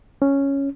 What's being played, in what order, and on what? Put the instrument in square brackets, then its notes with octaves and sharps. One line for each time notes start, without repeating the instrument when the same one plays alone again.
[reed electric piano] C#4